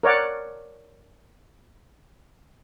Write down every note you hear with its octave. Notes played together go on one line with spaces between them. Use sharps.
A#4 C#5 D5 F#5